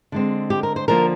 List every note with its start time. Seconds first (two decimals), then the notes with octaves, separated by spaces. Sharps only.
0.12 D3 G#3 C4
0.50 G4
0.63 A#4
0.76 C5
0.88 D3 F3 A#3 A#4